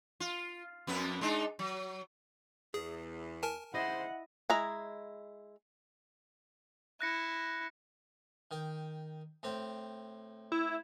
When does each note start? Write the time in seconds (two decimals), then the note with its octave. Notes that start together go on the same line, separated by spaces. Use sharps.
0.20 F4
0.87 F2 B3 B4
1.21 G#3 D4 D#4
1.59 F#3
2.74 E2 G#4
3.43 A#4 G#5 A5
3.74 C#3 G#3 E4 C5 D#5 F#5
4.50 G#3 E4 A#5
7.01 E4 F#6 A#6 C#7
8.51 D#3 G5
9.43 A2 C4 G5
10.52 E4